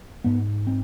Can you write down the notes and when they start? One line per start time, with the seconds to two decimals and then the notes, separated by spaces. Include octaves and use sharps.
0.24 G#2 B3
0.67 C4